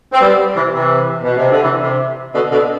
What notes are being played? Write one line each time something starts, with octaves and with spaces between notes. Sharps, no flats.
C4
G3 B3
C3 E3
C3 E3
B2
C3
D3
C3 E3
C3
B2 D3
B2 D3